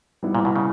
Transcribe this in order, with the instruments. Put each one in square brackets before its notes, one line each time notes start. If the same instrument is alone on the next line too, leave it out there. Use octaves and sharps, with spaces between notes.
[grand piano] G3 B3 E4
[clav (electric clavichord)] A#2
B2
C#3